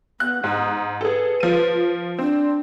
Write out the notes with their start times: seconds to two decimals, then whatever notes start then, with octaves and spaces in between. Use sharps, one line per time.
0.20 B3 F#6
0.44 G#2 D#4
1.01 G#4 A4 B4
1.40 F3 D#7
2.19 C4 D4